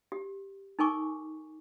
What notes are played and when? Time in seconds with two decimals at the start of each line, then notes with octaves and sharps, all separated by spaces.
0.12 G4
0.79 D#4 A4 A#4 G#5 C#6 D6